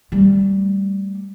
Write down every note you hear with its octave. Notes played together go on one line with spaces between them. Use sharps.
G3 A3